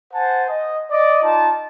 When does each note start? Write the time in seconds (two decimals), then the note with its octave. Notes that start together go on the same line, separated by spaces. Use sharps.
0.14 C5 F#5 G#5 A5
0.49 D#5
0.91 D5 D#5
1.23 D#4 F4 A5